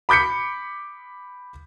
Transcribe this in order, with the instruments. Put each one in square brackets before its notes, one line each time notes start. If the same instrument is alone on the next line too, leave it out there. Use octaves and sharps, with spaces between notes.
[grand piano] B5 D6 G6 B6 C#7